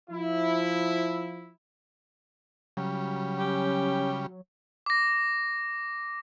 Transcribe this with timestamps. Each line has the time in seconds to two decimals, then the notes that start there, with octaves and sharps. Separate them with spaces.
0.10 F3 E4
2.77 C#3 F#3 G3
3.39 C#4 G4
4.86 D6 A#6